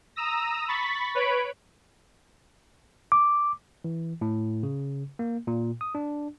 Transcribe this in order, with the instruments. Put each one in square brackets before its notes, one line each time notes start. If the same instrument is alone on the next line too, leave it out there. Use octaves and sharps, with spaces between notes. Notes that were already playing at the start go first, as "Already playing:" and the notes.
[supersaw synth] A#5 D#6 E6 A#6
B5 C#6 A6 B6
B4 C#5 B5 D7
[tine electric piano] D6
E3
A2
C#3
A#3
A#2
D#6
D4